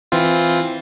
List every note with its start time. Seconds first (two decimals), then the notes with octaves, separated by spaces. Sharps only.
0.12 E3 C4 F4